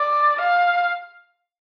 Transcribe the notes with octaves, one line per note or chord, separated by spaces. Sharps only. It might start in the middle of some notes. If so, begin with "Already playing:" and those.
Already playing: D5
F5